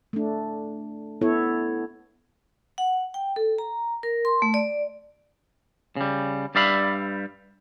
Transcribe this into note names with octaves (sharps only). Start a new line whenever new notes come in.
A3 D4
B3 E4 A4 C#5
F#5
G5
A4
A#5
A#4
C6
A3
D5
C#3 G3
G2 G3 D5 E5 F5 B5